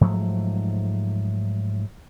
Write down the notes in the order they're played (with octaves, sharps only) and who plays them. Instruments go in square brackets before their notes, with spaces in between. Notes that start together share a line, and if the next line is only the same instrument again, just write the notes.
[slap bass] G#2 F3 F#3 A3